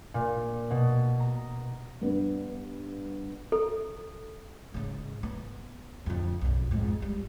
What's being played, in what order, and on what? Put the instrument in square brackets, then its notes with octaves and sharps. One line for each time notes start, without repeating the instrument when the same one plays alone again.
[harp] A#2
B2
A#5
[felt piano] G2 B3
[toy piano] A4
[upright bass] G#2 C#3
B3
F2 D3
B1 F#2
F2 G#2
G3